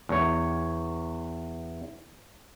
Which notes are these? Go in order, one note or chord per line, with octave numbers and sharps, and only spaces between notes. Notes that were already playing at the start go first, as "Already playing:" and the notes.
E2 C#5